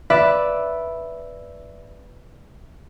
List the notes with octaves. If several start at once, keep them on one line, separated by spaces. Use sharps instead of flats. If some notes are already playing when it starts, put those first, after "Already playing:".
B4 D5 E5